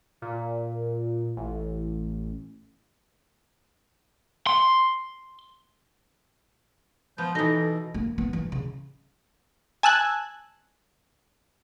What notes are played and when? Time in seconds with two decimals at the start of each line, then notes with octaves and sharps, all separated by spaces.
0.22 A#2
1.37 A1
4.47 C6
7.18 F3 B3 G6
7.35 B2 E3 D#4 A4 A#6
7.94 A#3
8.18 B3
8.33 E3
8.52 C#3
9.83 G#5 A5 E6 F#6 G#6